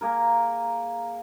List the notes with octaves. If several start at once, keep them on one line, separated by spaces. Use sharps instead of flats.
A#3 G#4 A#4